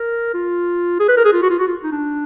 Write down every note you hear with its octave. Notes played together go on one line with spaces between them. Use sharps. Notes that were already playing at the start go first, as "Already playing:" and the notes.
Already playing: A#4
F4
G#4
B4
A#4
G#4
F4
F#4
F4
F#4
F4
D#4
D4